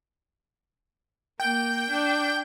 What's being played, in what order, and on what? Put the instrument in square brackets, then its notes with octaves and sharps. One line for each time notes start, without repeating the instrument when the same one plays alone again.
[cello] A#3 [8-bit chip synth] G5 G6
[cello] D4